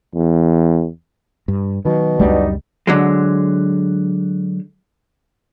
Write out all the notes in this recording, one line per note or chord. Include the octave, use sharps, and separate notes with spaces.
E2
G2
B2 D#3 F#3
C#2 F#2 G3 D4 D#4 F#4
D3 F#3 G#3